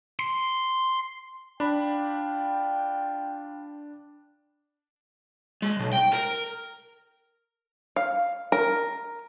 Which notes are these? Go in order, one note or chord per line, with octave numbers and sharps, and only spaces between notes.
C6
D4 F4 G5 B5
G#3
B1
G5
A#4
F5
A#4